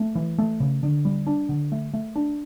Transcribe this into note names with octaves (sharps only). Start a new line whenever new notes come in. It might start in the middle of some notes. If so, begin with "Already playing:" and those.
Already playing: A3
E3
A3
C#3
D3
G3
D4
D3
A3
A3
D4